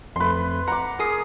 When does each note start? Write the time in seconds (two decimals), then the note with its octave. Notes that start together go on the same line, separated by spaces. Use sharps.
0.16 F2 A3 B4 C6
0.68 F#5 A#5 D6
0.99 G#4 A#4 D#6 C7